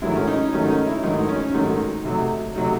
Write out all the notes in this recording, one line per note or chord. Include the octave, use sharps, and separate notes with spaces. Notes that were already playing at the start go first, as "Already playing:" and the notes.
G#2 D#3 F#3 A3 E4
C#4
D#4
G#2 D#3 F#3 A3 C#4
D#4
E4
G#2 D#3 F#3 A3 D#4
C#4
G#2 D#3 F#3 A3 D#4
C3 F#3 A3
C3 F#3 A3 D#4